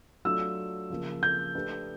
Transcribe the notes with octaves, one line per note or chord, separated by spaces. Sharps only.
F#3 A3 D4 F4 E6
C#3 F3 A#3
G6
A3 D4 G4 B4